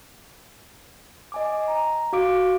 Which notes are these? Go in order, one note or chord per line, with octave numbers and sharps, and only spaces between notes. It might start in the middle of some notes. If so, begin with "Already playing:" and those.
D#5 G#5 D6
A#5
F#4 F5 D6 D7